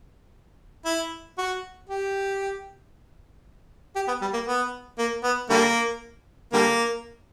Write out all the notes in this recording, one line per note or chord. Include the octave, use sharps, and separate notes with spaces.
E4
F#4
G4
G4
B3
G3
A#3
B3
A#3
B3
D3 G3 A#3
D3 G3 A#3